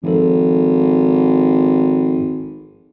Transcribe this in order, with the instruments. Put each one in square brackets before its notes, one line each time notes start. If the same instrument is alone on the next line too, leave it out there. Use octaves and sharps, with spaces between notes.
[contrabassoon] G#1 [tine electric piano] F3 A4